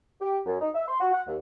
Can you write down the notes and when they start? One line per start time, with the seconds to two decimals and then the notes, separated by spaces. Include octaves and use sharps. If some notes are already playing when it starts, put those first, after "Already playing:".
0.21 G4
0.46 F#2
0.60 D#4
0.75 E5
0.88 C6
1.00 F#4
1.13 F#5
1.27 D#2